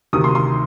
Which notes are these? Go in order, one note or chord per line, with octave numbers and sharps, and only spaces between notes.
D2 C3 D#3 D#6
C6
C6